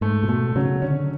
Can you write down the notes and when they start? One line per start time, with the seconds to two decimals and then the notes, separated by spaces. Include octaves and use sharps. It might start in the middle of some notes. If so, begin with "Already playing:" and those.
0.01 G#2 A3
0.23 A#2
0.29 B2 A3
0.56 C#3 F#3
0.82 D3 C#4